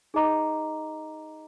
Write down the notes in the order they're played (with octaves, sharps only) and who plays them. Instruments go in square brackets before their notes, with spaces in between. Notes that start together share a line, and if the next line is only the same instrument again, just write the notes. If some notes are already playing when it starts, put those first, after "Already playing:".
[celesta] D#4 G#4 D#5 A#5 D6